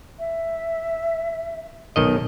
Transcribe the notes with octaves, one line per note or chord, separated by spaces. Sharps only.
E5
B1 D#3 A#4 D#5